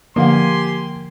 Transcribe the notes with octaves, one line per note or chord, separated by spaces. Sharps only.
D3 F3 A#3 G4 F5 F#5 G#5 C6